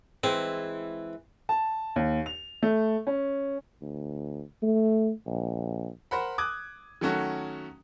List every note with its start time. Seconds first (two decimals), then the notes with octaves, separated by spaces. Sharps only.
0.24 E3 G#3 C4
1.49 A5
1.96 D#2
2.26 F7
2.63 A3
3.07 C#4
3.81 D2
4.63 A3
5.26 A#1
6.11 A#4 C5 F#5 B5
6.38 D6 D#6 F#6 G#6
7.01 D#3 F#3 A3 C#4 F#4